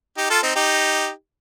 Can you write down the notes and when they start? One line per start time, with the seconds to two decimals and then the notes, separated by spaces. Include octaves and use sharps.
0.17 D#4 G4
0.30 F4 A4
0.43 C4 D#4
0.56 D#4 G4